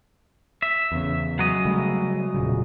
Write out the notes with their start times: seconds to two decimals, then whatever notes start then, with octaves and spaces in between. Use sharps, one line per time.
0.62 E5
0.92 E2 C#3
1.39 F#3 G#3 D#5
1.65 C#3 G3 A3
2.34 E1 A#2 C#3